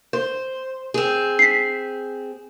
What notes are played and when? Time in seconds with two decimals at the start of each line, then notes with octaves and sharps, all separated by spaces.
0.13 C5
0.94 C4 G#4
1.39 B6 C7